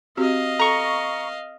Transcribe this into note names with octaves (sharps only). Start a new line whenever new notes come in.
C4 F#4 G4 D#5 F5
A4 A#5 C#6